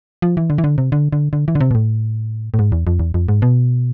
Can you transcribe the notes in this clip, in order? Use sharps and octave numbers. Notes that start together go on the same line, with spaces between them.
F3
E3
D3
E3
D3
C3
D3
D3
D3
E3
D3
C3
B2
A2
A2
G#2
E2
F2
E2
F2
G#2
B2